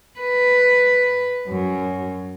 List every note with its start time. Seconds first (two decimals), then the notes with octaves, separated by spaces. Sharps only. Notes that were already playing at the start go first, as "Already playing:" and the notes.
0.19 B4
1.48 F#2